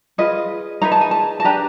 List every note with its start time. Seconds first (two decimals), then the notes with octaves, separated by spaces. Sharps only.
0.18 F4 G#4 B4 D#5
0.82 D#4 G#4 B4 A#5
0.92 A5
1.01 G#5
1.11 A5
1.40 A5
1.44 D4 G4 B4 A#5